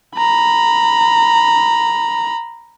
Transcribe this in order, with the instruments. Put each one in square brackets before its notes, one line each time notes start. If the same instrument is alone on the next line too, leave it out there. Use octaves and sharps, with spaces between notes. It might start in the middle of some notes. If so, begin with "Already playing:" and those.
[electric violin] A#5 B5